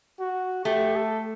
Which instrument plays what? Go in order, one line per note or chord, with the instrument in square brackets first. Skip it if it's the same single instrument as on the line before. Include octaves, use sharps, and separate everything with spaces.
[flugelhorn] F#4
[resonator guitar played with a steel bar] A3 [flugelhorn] G4
[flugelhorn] A4